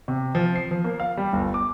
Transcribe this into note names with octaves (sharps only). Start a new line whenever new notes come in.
C3
F3
C7
F3
A#3
F5
G3
G1
D6